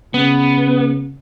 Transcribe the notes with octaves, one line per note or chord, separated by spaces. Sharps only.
C#3 B3